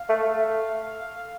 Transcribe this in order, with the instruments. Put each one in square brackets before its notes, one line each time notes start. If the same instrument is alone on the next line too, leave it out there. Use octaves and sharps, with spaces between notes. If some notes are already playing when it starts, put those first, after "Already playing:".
Already playing: [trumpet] F5
[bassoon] A3
A3